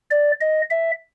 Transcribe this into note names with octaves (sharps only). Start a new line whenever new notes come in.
D5
D#5
E5